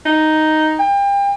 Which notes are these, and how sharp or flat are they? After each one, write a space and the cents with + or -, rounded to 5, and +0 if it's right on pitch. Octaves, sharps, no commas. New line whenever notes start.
D#4 +0
G5 +35